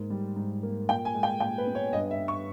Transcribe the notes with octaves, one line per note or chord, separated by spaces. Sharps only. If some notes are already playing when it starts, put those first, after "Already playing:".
Already playing: G#2 A#3
G3
G#2
A#3
A#2 G5
G#5
G#3
G5
A#2 G5
B4
B3
C#5
G2 D#5
E5
G3
C#6